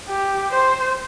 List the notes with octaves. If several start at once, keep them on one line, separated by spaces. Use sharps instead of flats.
G4
C5